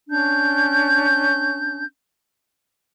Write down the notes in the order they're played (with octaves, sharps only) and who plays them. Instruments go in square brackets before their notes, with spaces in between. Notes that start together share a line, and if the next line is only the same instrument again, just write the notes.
[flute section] C#4 D4 G6